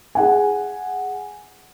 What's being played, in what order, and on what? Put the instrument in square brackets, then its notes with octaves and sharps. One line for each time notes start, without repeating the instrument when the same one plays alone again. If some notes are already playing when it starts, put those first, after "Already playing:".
[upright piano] G#4 F#5 G#5